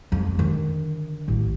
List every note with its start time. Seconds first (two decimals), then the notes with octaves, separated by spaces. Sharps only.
0.12 F2
0.35 D3 D#3
1.28 A1